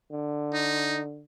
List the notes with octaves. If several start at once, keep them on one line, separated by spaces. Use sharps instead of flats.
D3
D#4